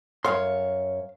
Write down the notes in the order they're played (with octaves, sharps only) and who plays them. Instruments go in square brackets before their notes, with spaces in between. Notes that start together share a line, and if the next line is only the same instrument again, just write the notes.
[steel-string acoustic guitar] F#2 C#5 [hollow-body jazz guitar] F5 C6